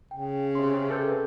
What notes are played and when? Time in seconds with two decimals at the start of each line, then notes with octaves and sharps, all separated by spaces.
0.11 C#3 G5
0.55 C3 C#4 C6
0.91 G#4 A4 B4 G6